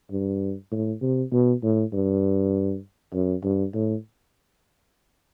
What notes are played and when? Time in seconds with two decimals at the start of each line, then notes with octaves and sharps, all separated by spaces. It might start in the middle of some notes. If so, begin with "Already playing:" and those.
0.11 G2
0.72 A2
1.02 C3
1.32 B2
1.63 A2
1.93 G2
3.14 F#2
3.44 G2
3.74 A2